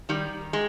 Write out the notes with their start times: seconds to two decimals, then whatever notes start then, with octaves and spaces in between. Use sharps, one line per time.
0.09 D#3 G3
0.53 G#3